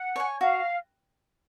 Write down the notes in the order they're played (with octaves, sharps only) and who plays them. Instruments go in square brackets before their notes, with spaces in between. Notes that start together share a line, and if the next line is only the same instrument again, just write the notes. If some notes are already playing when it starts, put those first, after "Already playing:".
Already playing: [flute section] F#5
[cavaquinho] C#5 G#5
[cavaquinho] F#4 [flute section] F5